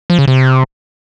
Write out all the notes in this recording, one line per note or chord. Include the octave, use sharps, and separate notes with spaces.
F3
C#3
C3